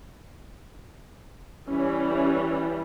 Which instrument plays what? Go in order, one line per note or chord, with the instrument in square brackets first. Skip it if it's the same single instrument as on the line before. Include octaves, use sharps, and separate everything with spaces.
[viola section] E3 G3 [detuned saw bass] C#4